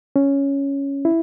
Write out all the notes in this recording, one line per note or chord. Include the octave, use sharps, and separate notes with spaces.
C#4
E4